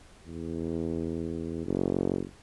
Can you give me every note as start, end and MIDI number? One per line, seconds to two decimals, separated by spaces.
0.25 1.65 40
1.66 2.24 30